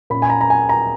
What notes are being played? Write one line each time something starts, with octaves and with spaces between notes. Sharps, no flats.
A#2 A#3 C#4 B5
G#5
A#5
A#5
G#5
A#5